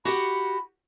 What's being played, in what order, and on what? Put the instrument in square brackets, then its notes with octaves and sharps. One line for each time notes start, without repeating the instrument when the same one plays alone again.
[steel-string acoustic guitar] F#4 G4 F#5 [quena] B5